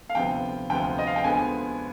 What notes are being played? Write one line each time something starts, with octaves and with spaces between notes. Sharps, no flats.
F5
D2 C3 F3 B3 G5
D2 C3 F3 B3 G5
D#5
F5
G5
D2 D3 F3 G#3 B3 G#5